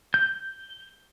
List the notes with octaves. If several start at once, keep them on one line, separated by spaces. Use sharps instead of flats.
G6